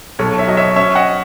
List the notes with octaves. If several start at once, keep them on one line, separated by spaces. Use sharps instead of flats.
B1 A4 C#5
C#5 E5
F#3 D#5
C#5 E5
C#4 C#5 E5
D#5 F#5